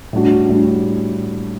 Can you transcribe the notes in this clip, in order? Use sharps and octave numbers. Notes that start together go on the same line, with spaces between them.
A2 G3 D4 F#4
A2 G3 D4 F#4